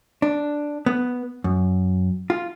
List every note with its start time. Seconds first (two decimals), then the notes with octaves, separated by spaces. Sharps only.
0.22 D4
0.86 B3
1.44 F#2
2.30 F4